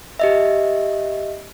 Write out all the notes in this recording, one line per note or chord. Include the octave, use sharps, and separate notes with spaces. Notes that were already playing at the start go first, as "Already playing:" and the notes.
G4 D#5 E5